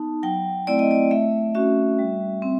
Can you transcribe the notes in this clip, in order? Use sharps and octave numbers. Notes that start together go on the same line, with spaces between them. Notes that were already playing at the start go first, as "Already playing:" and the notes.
Already playing: B3 D#4 A5
F#3 G5
A3 C4 E4 D5
D#5
D5
A3 E5
C#4 F#4 E5
G3
C4